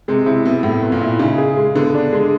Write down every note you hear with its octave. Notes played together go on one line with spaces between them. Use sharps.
C3 G#3
C3 E4
B2 E4
A2 E4
B3
A#2
E4
C#3 D#4
G#4
G#3
D3 B3
D4
G#3